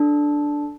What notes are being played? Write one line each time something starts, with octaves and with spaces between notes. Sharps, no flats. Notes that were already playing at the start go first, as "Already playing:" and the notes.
Already playing: D4 A4